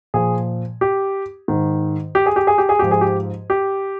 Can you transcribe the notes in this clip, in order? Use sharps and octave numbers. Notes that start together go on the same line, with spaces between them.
A#2 F3 G#4
G4
G#2 D#3
G4
G#4
G4
G#4
G4
G#4
G#2 F3 G4
G#4
G4
G4